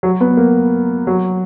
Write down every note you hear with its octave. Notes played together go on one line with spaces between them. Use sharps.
F#3
B3
A#3
F#3